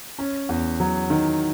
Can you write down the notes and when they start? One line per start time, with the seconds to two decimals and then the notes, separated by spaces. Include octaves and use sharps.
0.19 C#4
0.49 E2
0.80 F#3
1.10 D#3